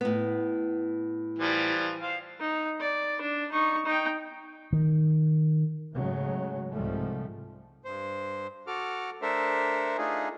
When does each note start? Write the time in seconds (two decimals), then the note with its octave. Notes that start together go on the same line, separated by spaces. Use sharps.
0.01 A2 B3
1.39 E3 F3 G3
2.01 C5 F5
2.41 D#4
2.80 D5
3.22 D4
3.52 D#4 C#6
3.86 D#4 G5
4.73 D#3
5.95 G#2 C#3 F#3 G#3 A3
6.73 C2 G#2 F3 G3 A3
7.85 G2 C5
8.67 F#4 A4 D6 F6
9.22 A3 D4 A4 A#4 C5 E5
9.98 A3 D4 D#4 F4 G#4